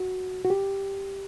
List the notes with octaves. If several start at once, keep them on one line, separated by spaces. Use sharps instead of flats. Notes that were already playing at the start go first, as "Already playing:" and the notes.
Already playing: F#4
F#4
G4